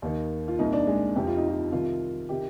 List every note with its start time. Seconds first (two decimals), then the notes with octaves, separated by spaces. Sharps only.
0.02 D#2 D#3
0.48 F4
0.59 C2 A#2 D#4
0.73 D4
0.87 G#3
1.16 F1 F2 C3 G4
1.27 F4
1.37 D#4
1.48 F4
1.72 C2 C3 D#3 F4
2.29 C3 D#3 G4